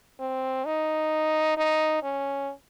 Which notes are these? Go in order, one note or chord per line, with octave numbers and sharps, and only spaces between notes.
C4
D#4
D#4
C#4